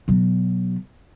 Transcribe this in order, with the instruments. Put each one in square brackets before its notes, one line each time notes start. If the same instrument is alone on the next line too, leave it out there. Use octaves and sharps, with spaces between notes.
[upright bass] B2 F#3